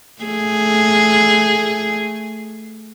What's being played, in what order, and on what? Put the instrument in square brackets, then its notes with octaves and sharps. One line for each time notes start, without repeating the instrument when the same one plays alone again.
[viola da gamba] A3 G#4